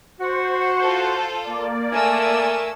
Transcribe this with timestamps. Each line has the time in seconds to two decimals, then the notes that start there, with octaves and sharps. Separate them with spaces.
0.20 F#4 C5 F#5
0.81 F4 A4
1.44 A#3 D5
1.92 A3 A#4 G#5 E6